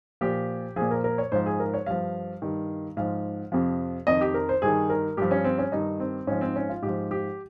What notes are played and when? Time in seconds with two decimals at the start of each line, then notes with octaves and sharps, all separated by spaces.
0.21 A#2 F3 G4
0.76 A#2 F3 G#4
0.91 A#4
1.04 A#4
1.18 C#5
1.32 G#2 F3 C5
1.46 G#4
1.60 A#4
1.74 C#5
1.86 G2 F3 F5
2.42 G2 D#3
2.97 G#2 F3 F5
3.52 F2 C3 F3
4.07 F2 D#3 D#5
4.21 G4
4.34 A#4
4.49 C5
4.62 G2 D#3 G#4
4.90 A#4
5.17 G2 F3 G4
5.31 C#4
5.45 C4
5.58 C#4
5.72 G2 D#3 D#4
6.00 C4
6.27 G#2 F3 C#4
6.41 C4
6.56 C#4
6.69 F4
6.82 G#2 F3 G4
7.11 G4